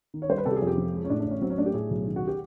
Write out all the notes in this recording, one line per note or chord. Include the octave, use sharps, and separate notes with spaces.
D#3
C#5
G3 C5
B4
C3 A4
G4
G#4
F2
G4
F3
G#3
C#4
A2 D4
D4
A1 C#4
F#3 C4
C#4
A3 D4
G4
A2 G#4
B1
D#3
F#4
G4